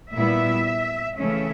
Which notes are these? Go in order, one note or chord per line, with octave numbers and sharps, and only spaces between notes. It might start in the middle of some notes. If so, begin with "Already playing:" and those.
A#2 G3 B3 E4 E5
C#3 E3 A3 C#4 E5